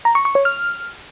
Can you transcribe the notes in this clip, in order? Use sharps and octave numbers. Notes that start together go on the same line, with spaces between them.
A#5
C#6
C#6
C#5
F6